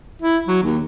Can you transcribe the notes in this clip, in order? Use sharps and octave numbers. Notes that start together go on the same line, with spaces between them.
E4
F#3
D#2